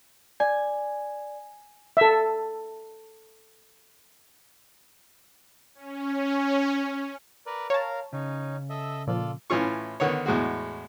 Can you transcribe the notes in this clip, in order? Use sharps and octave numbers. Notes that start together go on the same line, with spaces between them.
D5 G#5
A4 E5
C#4
A#4 B4 D5
A#4 C#5 F5 A5
C#3 C#4 D#4
A4 D#5 E5
A#2 F3 F4 A4 D5
A2 E3 C#4 F4 C#6
D3 D#3 B3 C#5
E2 A2 G#3 F#4